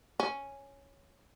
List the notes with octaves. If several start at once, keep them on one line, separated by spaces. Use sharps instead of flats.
C#4